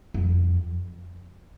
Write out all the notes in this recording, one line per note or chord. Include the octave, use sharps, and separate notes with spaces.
F2